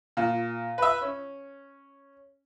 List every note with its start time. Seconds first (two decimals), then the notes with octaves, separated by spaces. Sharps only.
0.17 A#2
0.78 B4 E5
1.01 C#4